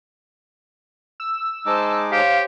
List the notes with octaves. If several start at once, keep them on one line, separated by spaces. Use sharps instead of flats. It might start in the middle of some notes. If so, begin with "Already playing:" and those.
E6
G#3 D#4 C5 A5 D6
G4 C5 C#5 F5